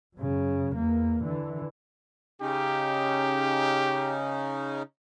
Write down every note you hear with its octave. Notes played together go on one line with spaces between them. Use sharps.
F#2 C#3
E2 A#3
D3 E3
C#3 C#4 D#4 G4